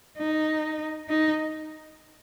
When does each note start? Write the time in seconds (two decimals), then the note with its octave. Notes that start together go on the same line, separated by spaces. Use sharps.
0.18 D#4
1.09 D#4